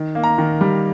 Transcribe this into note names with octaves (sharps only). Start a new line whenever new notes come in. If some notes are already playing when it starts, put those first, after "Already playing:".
Already playing: D#3
A#3
A#5
D#3
G3